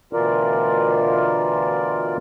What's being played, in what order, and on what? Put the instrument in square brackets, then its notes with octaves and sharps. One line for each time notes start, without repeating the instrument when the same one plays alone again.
[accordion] D2 B2 E3 F4 A#4 D5